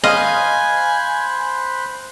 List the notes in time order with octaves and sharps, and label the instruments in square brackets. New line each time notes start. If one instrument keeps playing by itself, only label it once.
[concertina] C5 B5 F#6 [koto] D#5 [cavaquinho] F5 [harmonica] G#5